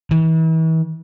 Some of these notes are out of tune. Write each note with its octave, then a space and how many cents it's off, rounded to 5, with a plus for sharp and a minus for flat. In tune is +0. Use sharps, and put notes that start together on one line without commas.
E3 -40